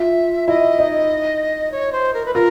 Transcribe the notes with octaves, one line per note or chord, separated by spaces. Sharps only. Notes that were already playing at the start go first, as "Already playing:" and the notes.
Already playing: F4 E5
E4 D#5
D#4
C#5
C5
A#4
B4
F4 A#4